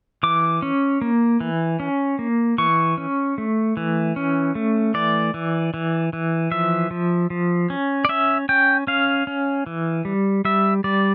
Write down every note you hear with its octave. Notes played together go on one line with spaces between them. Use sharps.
E3 D6
C#4
A#3
E3
C#4
A#3
E3 C#6
C#4
A3
E3
C#4
A3
E3 D5
E3
E3
E3
F3 E5
F3
F3
C#4
D5
C#4 E5
C#4 G5
C#4 F5
C#4
E3
G3
G3 E5
G3 D5